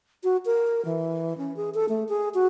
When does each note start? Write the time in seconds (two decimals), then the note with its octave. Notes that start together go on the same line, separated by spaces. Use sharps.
0.24 F#4
0.46 A#4
0.85 E3
1.38 C#4
1.56 G#4
1.75 A4
1.89 A3
2.09 G#4
2.34 F#4